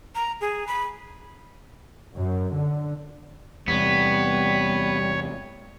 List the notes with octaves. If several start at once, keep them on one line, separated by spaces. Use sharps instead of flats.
A#5
G#4
B5
F#2
D3
E2 C3 G3 B3 C#5